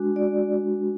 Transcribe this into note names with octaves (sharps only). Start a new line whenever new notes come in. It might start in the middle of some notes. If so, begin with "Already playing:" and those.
Already playing: G#3 D4 F#4
D5